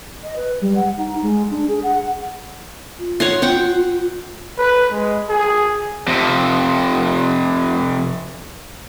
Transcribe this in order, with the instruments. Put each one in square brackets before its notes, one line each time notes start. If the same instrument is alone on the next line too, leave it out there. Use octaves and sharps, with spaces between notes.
[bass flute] D#5
B4
G3
F#5
D#4
G#3
D4
G#4
F#5
[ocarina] F4
[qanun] C#5 F#5 C6
F#5 G5 C6
[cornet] B4
G#3
G#4
[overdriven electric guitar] F2 C3